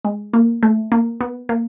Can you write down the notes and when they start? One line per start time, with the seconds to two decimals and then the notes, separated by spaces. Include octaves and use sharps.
0.05 G#3
0.34 A#3
0.63 A3
0.92 A#3
1.21 B3
1.49 A#3